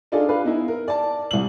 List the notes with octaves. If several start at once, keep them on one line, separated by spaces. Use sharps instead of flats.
D4 D#4 F4 G#4 A4 D5
B4 F5
B3 D#4 E4
A#4
D5 A5
C2 F#7